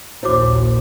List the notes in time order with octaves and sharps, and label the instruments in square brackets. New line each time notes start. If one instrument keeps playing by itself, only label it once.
[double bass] A#1 D#2 [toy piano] E4 C#5 D6 [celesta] F#4 C5